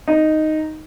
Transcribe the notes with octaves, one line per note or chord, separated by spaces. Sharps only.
D#4